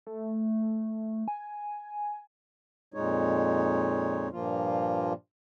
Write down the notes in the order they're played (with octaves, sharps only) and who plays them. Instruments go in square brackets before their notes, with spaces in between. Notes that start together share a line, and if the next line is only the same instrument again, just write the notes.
[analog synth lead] A3
G#5
[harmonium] F2 A#2 G#3 D#4 C#5
G2 A#2 F3 A#3 F4